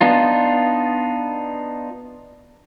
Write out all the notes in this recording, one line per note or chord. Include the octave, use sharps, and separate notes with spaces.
B3 D4 D#4 F4